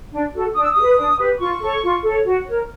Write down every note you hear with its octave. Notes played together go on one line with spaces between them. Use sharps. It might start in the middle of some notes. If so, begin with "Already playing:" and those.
D4
F#4 A4
D4 D#6
E6
G4 D#6
B4
D4
G4 B4
F4 C#6
A4 C#5
F4
A4 C#5
F#4
A#4 C#5